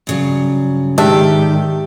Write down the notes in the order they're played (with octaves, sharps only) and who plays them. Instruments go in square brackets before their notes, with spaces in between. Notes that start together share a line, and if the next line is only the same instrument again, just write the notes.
[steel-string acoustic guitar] G2 C#3 F#3
[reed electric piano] G#2 G#3 [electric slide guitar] D#3 [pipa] D4 E5 [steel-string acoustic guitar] G4